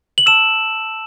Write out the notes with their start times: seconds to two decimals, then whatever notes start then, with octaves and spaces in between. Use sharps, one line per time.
0.18 F#7
0.26 A5 E6 E7